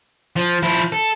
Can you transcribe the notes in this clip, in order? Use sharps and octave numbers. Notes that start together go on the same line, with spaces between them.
F3
F3 E4
A4